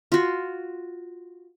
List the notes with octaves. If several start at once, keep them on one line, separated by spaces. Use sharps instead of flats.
F4 F#4